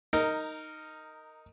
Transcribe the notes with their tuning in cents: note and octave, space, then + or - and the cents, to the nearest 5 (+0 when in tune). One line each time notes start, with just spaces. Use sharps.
D#4 +0 A#4 -15